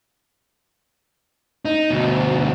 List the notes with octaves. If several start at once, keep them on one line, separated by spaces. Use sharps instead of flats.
D#4
D2 B2